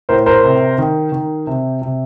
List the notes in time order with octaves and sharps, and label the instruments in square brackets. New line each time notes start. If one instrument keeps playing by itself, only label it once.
[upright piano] A2 A#4 C5
A#4 C5
C3
D#3
D#3
C3
C3